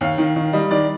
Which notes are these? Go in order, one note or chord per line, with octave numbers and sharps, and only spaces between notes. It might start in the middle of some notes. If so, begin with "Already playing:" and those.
D#2 F5
D#3
D#3
G3 D#5
D#3 D5